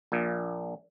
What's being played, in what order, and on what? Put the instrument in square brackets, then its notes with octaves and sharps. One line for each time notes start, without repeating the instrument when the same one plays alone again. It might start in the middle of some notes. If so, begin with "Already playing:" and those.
[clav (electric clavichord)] A#1 A#2